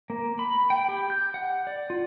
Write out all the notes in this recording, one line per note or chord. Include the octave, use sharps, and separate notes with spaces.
A#3
B5
G5
G4
G6
F#5
D5
F4